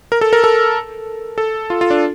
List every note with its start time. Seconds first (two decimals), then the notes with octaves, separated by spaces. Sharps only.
0.12 A#4
0.21 A4
0.33 A#4
0.44 A4
1.38 A4
1.70 F4
1.81 F4
1.90 D4